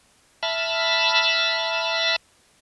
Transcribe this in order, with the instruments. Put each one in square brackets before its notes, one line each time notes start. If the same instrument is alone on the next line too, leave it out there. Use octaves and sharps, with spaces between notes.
[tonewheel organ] E5 A5 B5 F6